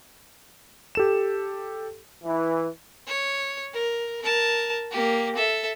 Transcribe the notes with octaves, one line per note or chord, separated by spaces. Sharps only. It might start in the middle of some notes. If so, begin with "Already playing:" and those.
G4 A4 E7
E3
C#5
A#4
A#4 A5
A#3 G4
A4 E5